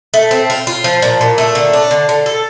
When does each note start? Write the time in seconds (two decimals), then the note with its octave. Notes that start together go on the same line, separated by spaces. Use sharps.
0.14 A3
0.31 C4
0.50 F4
0.67 F4
0.84 F3
1.02 A#2
1.21 A#2
1.38 A3
1.55 D3
1.73 D4
1.91 D3
2.09 D3
2.26 A4